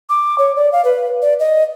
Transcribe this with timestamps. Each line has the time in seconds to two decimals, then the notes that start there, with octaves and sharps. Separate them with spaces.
0.09 D6
0.38 C#5
0.56 D5
0.72 F5
0.85 B4
1.22 D5
1.39 D#5